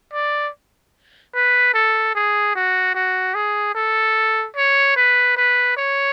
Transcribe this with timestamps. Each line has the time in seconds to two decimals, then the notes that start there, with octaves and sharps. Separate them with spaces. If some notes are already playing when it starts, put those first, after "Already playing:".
0.13 D5
1.35 B4
1.74 A4
2.15 G#4
2.55 F#4
2.95 F#4
3.35 G#4
3.75 A4
4.56 C#5
4.96 B4
5.37 B4
5.77 C#5